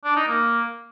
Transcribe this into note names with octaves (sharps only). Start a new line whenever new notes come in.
D4
D#4
A#3